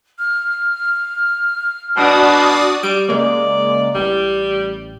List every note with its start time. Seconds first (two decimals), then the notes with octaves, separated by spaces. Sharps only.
0.19 F6
1.97 B2 D4 F#4 D5 D#6
2.83 G3 D7
3.09 C#3 G#3 A#3 D5
3.95 A1 G3